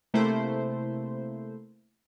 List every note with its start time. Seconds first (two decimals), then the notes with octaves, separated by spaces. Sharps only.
0.14 C3 A3 A#3 E4 C5